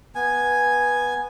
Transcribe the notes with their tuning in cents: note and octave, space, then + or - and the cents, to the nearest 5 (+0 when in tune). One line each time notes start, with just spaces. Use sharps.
B3 -10 G#5 +0